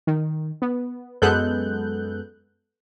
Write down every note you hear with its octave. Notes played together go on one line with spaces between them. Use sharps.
D#3
B3
F#2 G#3 B3 A4 F#6 G6